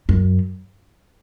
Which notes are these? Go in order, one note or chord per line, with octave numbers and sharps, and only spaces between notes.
F#2